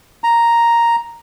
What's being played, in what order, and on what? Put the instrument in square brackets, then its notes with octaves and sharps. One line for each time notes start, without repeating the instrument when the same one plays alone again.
[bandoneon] A#5